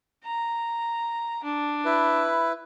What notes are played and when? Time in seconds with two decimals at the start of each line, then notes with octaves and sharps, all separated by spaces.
0.24 A#5
1.44 D4
1.85 E4 B4